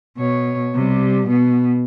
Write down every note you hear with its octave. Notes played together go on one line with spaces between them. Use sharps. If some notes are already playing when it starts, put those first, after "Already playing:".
B2 C#5
C3 G3
B2 B3